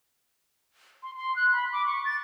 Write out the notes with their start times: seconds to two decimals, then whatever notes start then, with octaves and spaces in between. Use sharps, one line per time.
1.03 C6
1.17 C6
1.36 F#6
1.52 B5
1.73 D6
1.86 C#6
2.05 A6